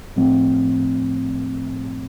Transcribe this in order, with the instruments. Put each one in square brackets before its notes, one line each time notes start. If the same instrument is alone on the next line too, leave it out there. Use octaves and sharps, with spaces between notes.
[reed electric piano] A2 F3 A3 C4